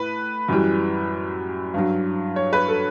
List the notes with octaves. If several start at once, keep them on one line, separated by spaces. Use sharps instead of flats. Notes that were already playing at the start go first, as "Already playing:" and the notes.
Already playing: A2 B4
F#2 E3 G3
G2 F#3
C#5
B4
A4